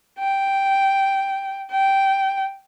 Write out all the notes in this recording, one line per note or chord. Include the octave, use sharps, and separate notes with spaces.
G5
G5